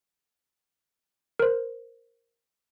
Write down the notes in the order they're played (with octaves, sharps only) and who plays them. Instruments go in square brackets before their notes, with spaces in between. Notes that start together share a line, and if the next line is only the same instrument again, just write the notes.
[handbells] A#4 C5